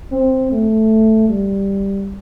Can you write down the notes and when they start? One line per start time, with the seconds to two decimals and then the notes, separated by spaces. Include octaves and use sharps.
0.12 C4
0.51 A3
1.29 G3